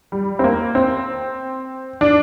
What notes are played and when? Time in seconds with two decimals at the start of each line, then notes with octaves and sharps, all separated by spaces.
0.12 G3
0.39 C4
0.44 A#3
0.75 C4
2.01 D4